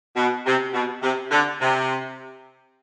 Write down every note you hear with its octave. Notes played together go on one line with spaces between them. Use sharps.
B2
C3
B2
C3
D3
C3